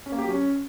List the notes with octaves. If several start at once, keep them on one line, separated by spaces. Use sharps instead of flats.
C#4
A#3
G4
F#3
C#4